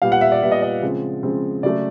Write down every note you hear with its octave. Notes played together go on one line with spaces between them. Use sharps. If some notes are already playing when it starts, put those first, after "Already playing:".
A#2 G3 B3 F5
F#5
E5
D5
A#2 G3 B3 E5
D#5
D#5
C#3 F3 G#3 C4
C#3 F3 G#3 C4
C#3 F#3 A3 D5